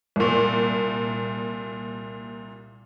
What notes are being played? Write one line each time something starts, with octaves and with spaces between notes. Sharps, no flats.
C2 A#2